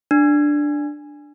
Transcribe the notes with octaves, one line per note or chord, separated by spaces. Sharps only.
D4